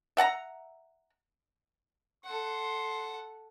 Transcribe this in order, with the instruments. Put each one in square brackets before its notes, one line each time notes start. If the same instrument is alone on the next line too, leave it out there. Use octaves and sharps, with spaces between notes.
[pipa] E5 F#5 A5 A#5
[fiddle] A4 F#5 [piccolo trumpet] C6